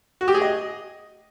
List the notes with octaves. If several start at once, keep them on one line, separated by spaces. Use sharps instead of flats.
F#4
G4
G#4
D#5